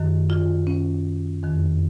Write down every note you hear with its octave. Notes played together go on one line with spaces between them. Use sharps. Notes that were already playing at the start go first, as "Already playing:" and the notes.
Already playing: F#2 D#3
F4
C#4
F2 D#3